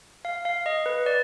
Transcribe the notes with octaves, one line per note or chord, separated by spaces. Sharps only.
F5
F5
D#5
B4
D5